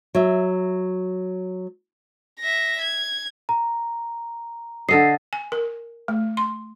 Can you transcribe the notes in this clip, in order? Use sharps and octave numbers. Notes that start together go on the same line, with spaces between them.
F#3 E5
E5 A#6
G#6
A#5
D3 A4 D#5 C7
G#5
A#4
A3
C6